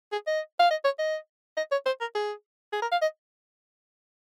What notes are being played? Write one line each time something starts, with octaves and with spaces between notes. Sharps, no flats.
G#4
D#5
F5
D#5
C#5
D#5
D#5
C#5
C5
A#4
G#4
G#4
A#4
F5
D#5